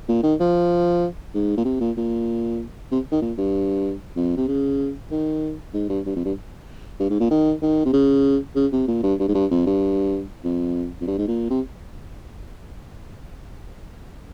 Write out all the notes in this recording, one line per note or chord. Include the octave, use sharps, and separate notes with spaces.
A#2
D#3
F3
G#2
A#2
C3
A#2
A#2
C3
D#3
A#2
G2
F2
C3
C#3
D#3
G#2
G2
G2
F2
G2
G2
G#2
A#2
D#3
D#3
C3
C#3
C#3
C3
A#2
G2
G2
G#2
G2
F2
G2
F2
F2
G2
G#2
A#2
C3